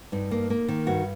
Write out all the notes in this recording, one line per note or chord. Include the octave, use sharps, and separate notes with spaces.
G2 D#4
A#3
A#3
D#3
G2 F#4